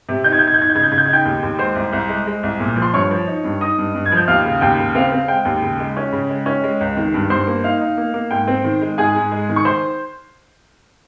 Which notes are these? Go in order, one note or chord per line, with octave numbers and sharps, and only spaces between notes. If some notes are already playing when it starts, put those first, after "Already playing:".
C3
D#4 G6
G#6
D#4 G6
G#6
G6
D#4 G#6
G6
C#3 G#6
G6
C#3 G#6
G6
G#6
D#4 G5 G6
D#2
D#2
G#3 C5 C6
C2
C2
G#3
G#3
C2
A#2
F3
C6
G2 C#5 C#6
F3
D#4
G2
D#4 D#5 D#6
G2
G2
G#6
F3
G6
D#2 F5 F6
C#3
D#2 G5
C#3
C4 F5
C4
G#3 G5
D#2
C#3
G#3
C#4
C#3
G#3
C#4
G#3
C#2
D#3
G2
G2 C5 C6
A#3
D#4 F5
D#4
A#3
A#3
G#2 G5
C4
D#3
G#3
G#2 G#4 G#5
G#2
G#3
D#3
C#6
C5 C6